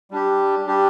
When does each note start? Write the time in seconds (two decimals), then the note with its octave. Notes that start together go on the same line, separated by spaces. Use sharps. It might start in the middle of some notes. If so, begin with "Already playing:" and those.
0.11 G3 D4 G4
0.66 G3 D4 G4